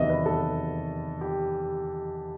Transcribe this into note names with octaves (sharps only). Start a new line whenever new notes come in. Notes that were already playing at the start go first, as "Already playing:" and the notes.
Already playing: E2 C3 D#3 F#3 D#5 E5
B4
A4
G4